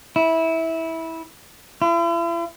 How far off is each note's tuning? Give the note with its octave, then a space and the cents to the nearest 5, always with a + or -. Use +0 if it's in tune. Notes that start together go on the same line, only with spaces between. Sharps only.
E4 -15
E4 +45